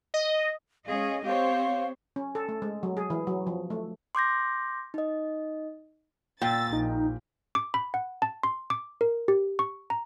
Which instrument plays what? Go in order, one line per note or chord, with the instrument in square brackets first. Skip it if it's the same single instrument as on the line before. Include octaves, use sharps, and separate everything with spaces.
[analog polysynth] D#5
[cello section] G#3 C#4 D#5 [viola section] G#4 [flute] F5
[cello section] C4 [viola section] G4 C5 C#5 [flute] F5
[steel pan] C#4
A4
A3
G#3
F#3
G#4
E3
F#3
F3
A3
[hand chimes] C6 D6 G6 A#6
D#4 D#5
[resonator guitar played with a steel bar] A#2 [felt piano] G5 [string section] E6 A6
[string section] A#1 [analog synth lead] D#4
[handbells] D6
B5
F#5
A5
C6
D6
A#4
G4
C#6
A#5